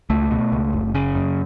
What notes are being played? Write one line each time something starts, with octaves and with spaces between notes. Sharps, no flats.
C#2 A3
B2
C#2
F#1
C#3
F#2